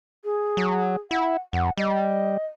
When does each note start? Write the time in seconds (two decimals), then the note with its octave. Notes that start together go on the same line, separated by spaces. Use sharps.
0.24 G#4
0.57 F#3
1.11 E4 F#5
1.53 F2 F#5
1.77 G3 D#5